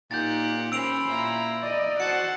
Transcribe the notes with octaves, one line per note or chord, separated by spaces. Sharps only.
A#2 D#4 G4 A#4 F#5 G6 A6
C#4 C5 B5 E6 D7 F7
A#2 E4 A#5
D5 D#5
F#4 C5 F#5 A5 A6 C#7